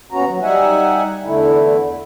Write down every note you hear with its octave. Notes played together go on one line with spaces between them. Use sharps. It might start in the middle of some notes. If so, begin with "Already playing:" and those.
D#2 B3 C#4 F#4 A#5
F#3
G3 D#4 E5 F#5 G#5
E2 D3 A3 E4